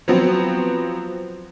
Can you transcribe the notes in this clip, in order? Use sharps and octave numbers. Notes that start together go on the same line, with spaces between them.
F3 F#3 B3 C4